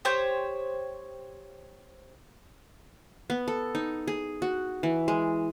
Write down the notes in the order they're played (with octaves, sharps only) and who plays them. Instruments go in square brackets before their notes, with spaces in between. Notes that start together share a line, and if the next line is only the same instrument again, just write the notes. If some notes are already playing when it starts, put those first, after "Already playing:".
[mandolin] G4 C5 C#5 G6
[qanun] B3
A4
D#4
G#4
F#4
E3
G#3